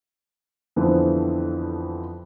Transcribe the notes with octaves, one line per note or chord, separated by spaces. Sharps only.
F2 D3 E3 F3 B3 C4